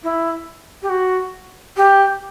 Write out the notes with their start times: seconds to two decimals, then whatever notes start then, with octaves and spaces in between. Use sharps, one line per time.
0.03 E4
0.82 G4
0.89 F#4
1.76 G4